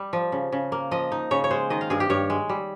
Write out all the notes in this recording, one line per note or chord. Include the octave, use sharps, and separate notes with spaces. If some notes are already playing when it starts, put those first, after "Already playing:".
Already playing: G3
F3
C#3
C#3
A#3
F3 D#5
D#4
C#3 C#5
C#5
G#3 C5
D#3 D#5
F5
G2 G#4
G4
G2 C#5
G#3
G3